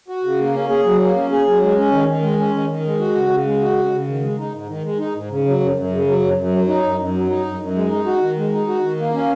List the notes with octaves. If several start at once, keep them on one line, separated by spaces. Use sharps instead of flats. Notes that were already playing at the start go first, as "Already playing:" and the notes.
F#4
C#3
A#3
C#4
G#4
F#3
A#3
C#4
G#4
F#3
G#3
C#4
D#3
D#3
G#3
C#4
D#3
D#3
G#3
F#4
C#3
C#3
G#3
F#4
C#3
C#3
D#3
G#3
D#4
G#2
D#3
G#3
D#4
G#2
C#3
F#3
F#2
F#2
C#3
F#3
F#2
F#2
F#3
D#4
F#2
F#2
F#3
D#4
F#2
F#2
G#3
D#4
F#4
D#3
G#3
D#4
F#4
D#3
A#3
C#4